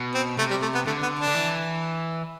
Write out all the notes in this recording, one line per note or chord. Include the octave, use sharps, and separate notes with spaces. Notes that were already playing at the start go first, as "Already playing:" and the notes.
Already playing: B2
C4
C3 A3
G3
A3
B3
D3 A3
B3
D4
D3
E3